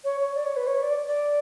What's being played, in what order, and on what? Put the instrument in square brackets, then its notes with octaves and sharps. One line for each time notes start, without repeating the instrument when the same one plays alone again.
[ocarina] C#5
C#5
D5
C#5
B4
C#5
D5
D5